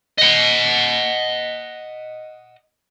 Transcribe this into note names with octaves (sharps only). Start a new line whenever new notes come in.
D#5 F#5